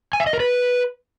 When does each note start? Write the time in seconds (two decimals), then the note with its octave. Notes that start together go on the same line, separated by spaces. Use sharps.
0.13 G#5
0.20 E5
0.27 D#5
0.33 A#4
0.40 B4